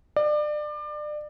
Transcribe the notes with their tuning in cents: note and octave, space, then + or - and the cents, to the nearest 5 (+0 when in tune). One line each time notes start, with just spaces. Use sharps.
D5 +30